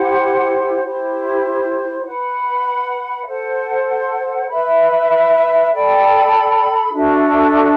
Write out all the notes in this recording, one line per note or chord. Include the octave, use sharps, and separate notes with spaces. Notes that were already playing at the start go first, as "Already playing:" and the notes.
Already playing: E4 G4 C5 F#5
E4 G4 C5
B4 F#5 B5
A4 C5 F#5
B4 E5 B5
A4 D5 G5 B5
D4 F#4 A4 E5